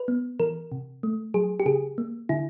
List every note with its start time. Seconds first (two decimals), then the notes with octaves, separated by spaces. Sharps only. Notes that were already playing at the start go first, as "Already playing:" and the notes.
Already playing: B4
0.08 B3
0.40 E3 A#4
0.72 C3
1.03 A3
1.34 F#3 G#4
1.60 G4
1.66 C#3 G#4
1.98 A#3
2.29 D3 E4